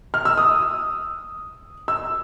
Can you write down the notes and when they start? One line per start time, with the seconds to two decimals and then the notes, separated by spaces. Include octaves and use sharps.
0.14 F6
0.25 E6
0.38 D#6
1.88 E6